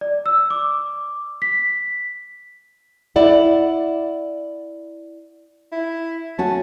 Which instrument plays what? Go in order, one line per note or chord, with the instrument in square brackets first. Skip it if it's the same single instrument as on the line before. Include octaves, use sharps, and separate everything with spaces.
[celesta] D5
E6
D6
B6
[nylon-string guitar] E4 D5 F#5
[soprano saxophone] E4
[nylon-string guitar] C#4 F#4 [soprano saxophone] A5